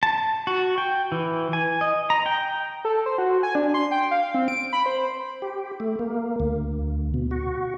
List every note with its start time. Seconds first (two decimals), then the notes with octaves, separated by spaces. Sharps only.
0.03 A5
0.47 F#4
0.78 G5
1.12 E3
1.53 G#5
1.81 D#5
2.10 A#5
2.26 G5
2.85 A4
3.06 C5
3.18 F#4
3.43 G#5
3.55 D4
3.74 C6
3.91 G5
4.11 F5
4.35 C4
4.48 D7
4.73 B5
4.86 C5
5.42 G4
5.80 A3
5.99 A#3
6.40 D2
7.14 B2
7.31 F#4